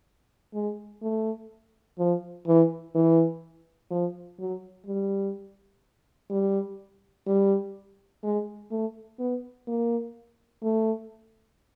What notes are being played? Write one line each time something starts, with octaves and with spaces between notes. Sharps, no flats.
G#3
A3
F3
E3
E3
F3
F#3
G3
G3
G3
G#3
A3
B3
A#3
A3